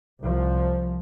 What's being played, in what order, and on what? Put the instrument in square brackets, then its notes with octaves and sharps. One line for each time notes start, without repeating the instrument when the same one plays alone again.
[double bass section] C2 F3